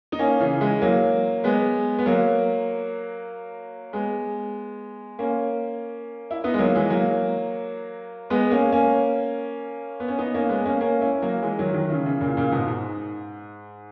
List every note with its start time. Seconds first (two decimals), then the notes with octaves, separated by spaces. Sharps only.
0.12 D#4
0.19 A#3 C#4
0.40 C#3 E3
0.61 E3 G#3
0.82 F#3 A#3
1.44 G#3 B3
1.99 B3
2.06 F#3 A#3
3.93 G#3 B3
5.19 A#3 C#4
6.31 E4
6.44 B3 D#4
6.54 G#3
6.59 F#3 A#3
6.75 E3 G#3
6.90 F#3 A#3
8.30 G#3 B3
8.51 A#3 C#4
8.72 A#3 C#4
10.00 B3
10.08 C#4
10.18 B3 D#4
10.34 A#3 C#4
10.49 G#3 B3
10.66 A#3 C#4
10.81 A#3 C#4
11.01 C#4 E4
11.22 F#3 A#3
11.43 E3 G#3
11.59 D#3 F#3
11.69 E3
11.74 D#3 F#3
11.89 C#3 E3
12.06 C#3 E3
12.21 A#2 C#3
12.37 A#2 C#3
12.52 G#2 B2
12.68 G#2